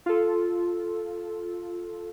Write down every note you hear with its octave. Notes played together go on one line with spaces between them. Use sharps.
F4 A4